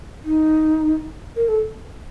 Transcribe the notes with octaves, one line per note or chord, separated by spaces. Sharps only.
D#4
A#4
A4